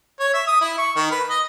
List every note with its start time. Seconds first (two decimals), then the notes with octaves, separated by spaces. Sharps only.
0.19 C#5
0.33 E5
0.47 D#6
0.61 E4
0.78 C#6
0.96 D#3
1.11 B4
1.29 D#5